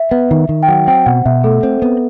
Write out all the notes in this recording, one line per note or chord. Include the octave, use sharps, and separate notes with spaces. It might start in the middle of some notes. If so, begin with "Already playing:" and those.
Already playing: E5
B3
D#3
D#3
G5
F#3 F#5
C4 G5
B2 F#5
B2 E5
A3 A4
C4
B3